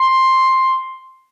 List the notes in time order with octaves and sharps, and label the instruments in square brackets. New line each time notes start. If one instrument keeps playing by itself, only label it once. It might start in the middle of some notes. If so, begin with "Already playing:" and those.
Already playing: [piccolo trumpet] C6